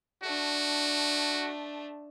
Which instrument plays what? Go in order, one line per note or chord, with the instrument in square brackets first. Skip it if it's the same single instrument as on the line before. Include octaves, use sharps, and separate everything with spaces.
[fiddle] A3 D4 [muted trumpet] F#4